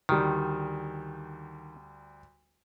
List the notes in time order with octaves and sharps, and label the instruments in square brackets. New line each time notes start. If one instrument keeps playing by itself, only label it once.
[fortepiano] D2 G3 [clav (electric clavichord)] D#3